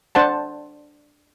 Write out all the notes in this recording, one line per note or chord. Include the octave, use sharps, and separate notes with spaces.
D4 C5 F#5 A5